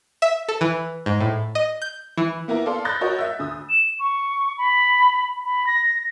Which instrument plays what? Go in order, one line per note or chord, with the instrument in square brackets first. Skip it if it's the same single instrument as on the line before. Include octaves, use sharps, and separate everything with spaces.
[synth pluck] E5
A4
E3
G#2
A2
D#5
G6
E3
[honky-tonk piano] A#3 B3 E4 A#4
A4 D5 F5 C6
B5 E6 F#6 G6 A6 A#6
F#4 A#4 C#5 D#5
E5 E6
D2 D#6
[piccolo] E7
C#6
B5
B5
A#6